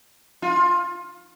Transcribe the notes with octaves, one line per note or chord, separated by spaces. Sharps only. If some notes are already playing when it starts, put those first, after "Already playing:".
F4